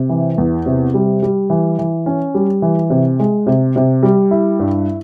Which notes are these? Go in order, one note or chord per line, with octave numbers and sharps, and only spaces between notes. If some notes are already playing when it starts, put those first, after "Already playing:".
Already playing: C3
E3
E2
C3
G3
G3
E3
E3
C#4
G3
E3
C3
G#3
C3
C3
G3
E4
G2